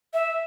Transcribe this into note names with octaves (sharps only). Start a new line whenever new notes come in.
E5